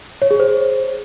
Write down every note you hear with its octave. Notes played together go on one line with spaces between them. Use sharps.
C#5
G#4
C5